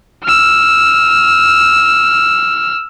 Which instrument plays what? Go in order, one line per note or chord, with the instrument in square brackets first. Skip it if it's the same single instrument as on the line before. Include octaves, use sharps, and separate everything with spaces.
[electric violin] E6 F6